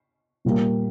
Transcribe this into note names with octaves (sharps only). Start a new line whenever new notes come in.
A#2 G3 A#3